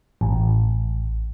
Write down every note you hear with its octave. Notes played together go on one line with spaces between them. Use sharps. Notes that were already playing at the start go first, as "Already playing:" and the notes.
A1